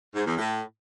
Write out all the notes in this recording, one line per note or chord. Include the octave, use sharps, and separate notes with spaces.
G#2
E2
A2